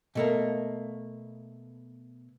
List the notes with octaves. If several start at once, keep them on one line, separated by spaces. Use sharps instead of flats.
B2 A3 A#3